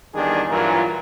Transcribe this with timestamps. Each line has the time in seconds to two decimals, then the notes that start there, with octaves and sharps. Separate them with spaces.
0.15 E2 D#3 G3 D4 G#4
0.49 G2 A#2 E3 F#3 F4 A#4